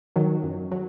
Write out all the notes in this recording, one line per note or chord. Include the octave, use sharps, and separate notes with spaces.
D#3 F#3
F#2
F#3